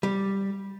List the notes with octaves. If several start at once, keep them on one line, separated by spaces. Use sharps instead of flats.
G3